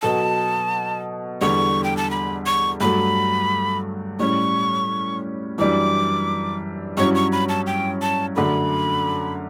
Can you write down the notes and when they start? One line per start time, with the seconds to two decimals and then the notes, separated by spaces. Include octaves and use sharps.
0.02 B2 F#3 B3 F#4 A4 A5
1.41 E2 D3 G3 C#6
1.84 G5
1.97 A5
2.11 B5
2.46 C#6
2.81 G2 F#3 A3 B5
4.19 A2 G3 C#4 C#6
5.58 F#2 E3 G3 D4 D6
6.97 G2 F#3 C#4 E4 C#6
7.15 C#6
7.32 B5
7.49 A5
7.67 G5
8.02 A5
8.36 F#2 D3 A3 B5